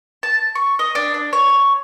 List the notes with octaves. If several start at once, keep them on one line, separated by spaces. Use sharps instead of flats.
A5
C#6
D#5
D4
D4
C#5